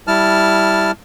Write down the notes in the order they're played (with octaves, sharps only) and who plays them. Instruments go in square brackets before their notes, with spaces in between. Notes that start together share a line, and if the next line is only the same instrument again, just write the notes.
[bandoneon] G3 E4 A5 F6